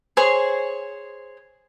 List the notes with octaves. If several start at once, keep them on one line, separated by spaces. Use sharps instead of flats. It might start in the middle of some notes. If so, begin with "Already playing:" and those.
G#4 C5 C#5